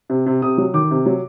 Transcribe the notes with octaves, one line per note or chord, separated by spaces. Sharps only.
C3
C3
C3 D#6
F#3
D#3 D6
C3
F#3